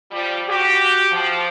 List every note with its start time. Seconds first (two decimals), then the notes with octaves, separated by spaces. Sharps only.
0.11 F3 G3
0.48 F#4 G4
1.12 F3